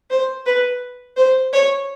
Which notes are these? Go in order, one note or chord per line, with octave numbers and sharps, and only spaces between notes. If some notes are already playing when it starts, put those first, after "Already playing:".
C5
B4
C5
C#5